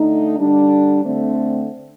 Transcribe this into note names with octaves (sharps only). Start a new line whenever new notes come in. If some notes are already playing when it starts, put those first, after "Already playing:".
Already playing: D3 A3 D#4
D3 G3 D4
D3 A3 C4